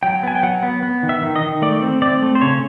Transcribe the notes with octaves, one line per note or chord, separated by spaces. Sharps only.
F#3 G5
B3 G#5
G5
F#3 F#5
B3
B3
D#3
E5
D#3
D#5
D#3
A3 D5
C4
C4 D5
A3
C5
C#3 C#5